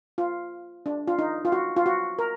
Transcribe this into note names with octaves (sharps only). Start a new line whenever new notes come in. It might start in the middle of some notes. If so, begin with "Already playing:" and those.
F4
D4
F4
D#4
F4
F#4
F4
F#4
A#4